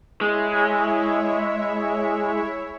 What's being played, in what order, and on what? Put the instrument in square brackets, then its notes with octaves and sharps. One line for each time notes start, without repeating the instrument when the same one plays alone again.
[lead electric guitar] G#3 [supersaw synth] E4 C#5 E5